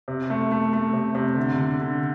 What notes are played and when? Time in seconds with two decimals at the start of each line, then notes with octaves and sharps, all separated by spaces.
0.08 C3
0.30 A3
0.52 A3
0.73 A3
0.93 C3
1.15 C3
1.37 D3
1.58 D3
1.80 D3